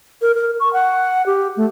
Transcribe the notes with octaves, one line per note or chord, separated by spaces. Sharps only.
A#4
A#4
C#6
F#5
G4
A3